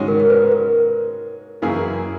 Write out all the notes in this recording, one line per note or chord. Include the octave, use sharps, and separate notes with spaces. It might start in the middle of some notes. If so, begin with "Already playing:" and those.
Already playing: G#2 D#3 G#3 C#4 F#4
A#4
A#4
B4
A#4
F#2 E3 A#3 E4 G#4